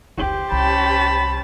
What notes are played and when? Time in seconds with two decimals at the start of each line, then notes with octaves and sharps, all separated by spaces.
0.18 F1 C#2 G4 C5
0.52 C2 C#4 A5 B5